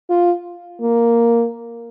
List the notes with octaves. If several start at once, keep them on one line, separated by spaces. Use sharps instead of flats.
F4
A#3